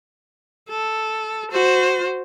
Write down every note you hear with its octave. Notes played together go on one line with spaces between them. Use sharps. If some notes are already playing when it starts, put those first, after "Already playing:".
A4
F#4 C5